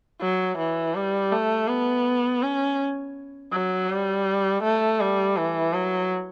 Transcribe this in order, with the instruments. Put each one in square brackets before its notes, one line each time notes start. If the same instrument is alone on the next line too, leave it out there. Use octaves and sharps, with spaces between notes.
[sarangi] F#3
E3
G3
A3
B3
C#4
F#3
G3
A3
G3
E3
F#3